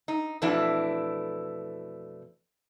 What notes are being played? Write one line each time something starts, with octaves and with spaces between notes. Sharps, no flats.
D#4
F2 B2 E3 A3 D4 E4